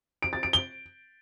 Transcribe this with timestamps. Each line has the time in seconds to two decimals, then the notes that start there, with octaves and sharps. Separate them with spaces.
0.22 D7
0.33 A6
0.43 D7
0.53 G7